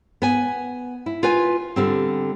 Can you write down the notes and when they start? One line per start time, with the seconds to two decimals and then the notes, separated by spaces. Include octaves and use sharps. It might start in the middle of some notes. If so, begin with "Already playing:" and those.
0.22 B3 G#5
1.06 E4
1.23 F4 B4 G#5
1.76 D3 G3 C4